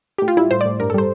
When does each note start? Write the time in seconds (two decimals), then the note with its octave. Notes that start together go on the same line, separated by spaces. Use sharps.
0.18 A2 G4
0.28 F4
0.37 G3 E4
0.51 A2 C5
0.61 D5
0.65 A2
0.80 G2 A#4
0.90 A4
0.94 G3 C5